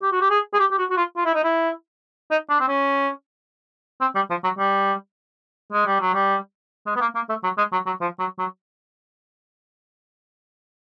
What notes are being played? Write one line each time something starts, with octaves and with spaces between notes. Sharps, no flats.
G4
F#4
G4
G#4
G#4
G4
G4
F#4
F#4
F4
F4
E4
D#4
E4
D#4
D4
C4
C#4
C4
G3
F3
F#3
G3
G#3
G3
F#3
G3
G#3
B3
A#3
A#3
A3
F#3
G#3
F#3
F#3
F3
F#3
F#3